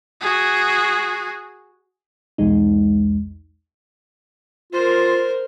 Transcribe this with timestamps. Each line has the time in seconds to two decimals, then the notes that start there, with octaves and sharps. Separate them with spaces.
0.21 F#4 G#4
2.38 B1 E2 G#3 D#4
4.73 F4 A#4 C5